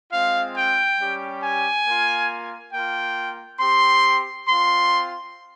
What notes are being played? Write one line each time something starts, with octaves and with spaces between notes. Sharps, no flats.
G#3 C4 F4 F5
G5
G3 C#4 G4
G#5
A#3 F4
A#3 F4 G5
C4 G4 C6
C4 F4 C6